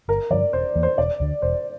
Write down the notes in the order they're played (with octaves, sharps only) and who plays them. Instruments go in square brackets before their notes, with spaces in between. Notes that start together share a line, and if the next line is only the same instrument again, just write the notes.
[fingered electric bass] G1 [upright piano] A#4
[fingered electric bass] G2 D3 F3 [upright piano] D5
[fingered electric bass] E1 [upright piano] C5
[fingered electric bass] E2 E3 A#3
[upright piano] C5
[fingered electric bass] E1 [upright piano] D5
[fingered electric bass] D2 D3
[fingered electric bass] E1 [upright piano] C5